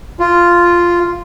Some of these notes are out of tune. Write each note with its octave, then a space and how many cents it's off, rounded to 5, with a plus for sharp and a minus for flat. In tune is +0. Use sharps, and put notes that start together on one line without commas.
F4 -5